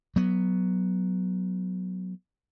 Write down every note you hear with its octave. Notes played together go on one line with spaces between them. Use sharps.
F#3 B3